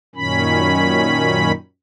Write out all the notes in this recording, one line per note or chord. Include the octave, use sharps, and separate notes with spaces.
F#2 A#2 D#3 C#4 B5